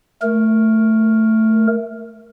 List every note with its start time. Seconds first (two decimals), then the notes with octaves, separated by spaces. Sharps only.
0.22 A3 A#4